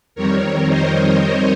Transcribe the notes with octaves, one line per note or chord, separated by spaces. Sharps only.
F2 D#3 G3 C4 A#4 C#5
C5 D#5